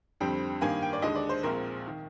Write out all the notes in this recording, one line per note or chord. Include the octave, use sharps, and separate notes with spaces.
F2 D3 G3 C4 G5
G2 D#3 A#3 G#5
G5
D5
D#2 D3 G#3 D#5
D5
C5
A#1 A#2 G#3 C4 A#4
D#3